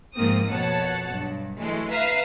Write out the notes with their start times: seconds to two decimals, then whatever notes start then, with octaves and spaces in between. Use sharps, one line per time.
0.14 G#2 F3 A#3 C4 D#6
0.49 F2 B2 C#5 F#5 A5
1.11 B1 G2
1.59 E3 F#3 G#3 A3
1.91 B4 E5 F5 A#5 F6